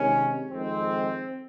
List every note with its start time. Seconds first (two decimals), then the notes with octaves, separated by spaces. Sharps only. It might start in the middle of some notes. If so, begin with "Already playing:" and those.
Already playing: C3 D#3 G#3 C#4
0.50 F2 D#3 G#3 C4